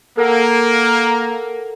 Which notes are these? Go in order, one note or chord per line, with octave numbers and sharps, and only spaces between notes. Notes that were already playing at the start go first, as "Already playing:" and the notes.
A#3 A4 A#4 F#5